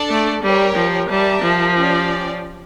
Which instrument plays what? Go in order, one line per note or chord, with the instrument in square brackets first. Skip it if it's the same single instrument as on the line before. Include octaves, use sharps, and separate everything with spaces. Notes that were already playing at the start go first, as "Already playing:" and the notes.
Already playing: [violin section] D4 A4 D5
[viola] A3
[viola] G3 [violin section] G4 A#4 C#5
[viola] F3
[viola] G3 [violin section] G4 A#4 E5 A5
[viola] F3
[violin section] C#4 G4 D5